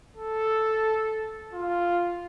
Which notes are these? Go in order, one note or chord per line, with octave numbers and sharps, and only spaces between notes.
A4
F4